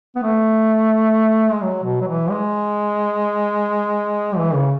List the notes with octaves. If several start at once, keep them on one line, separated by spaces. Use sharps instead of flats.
B3
A3
G#3
F#3
B2
F#3
E3
G#3
E3
C#3